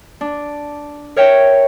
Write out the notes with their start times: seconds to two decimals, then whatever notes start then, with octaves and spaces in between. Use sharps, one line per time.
0.21 D4
1.16 A#4 C#5 E5 G5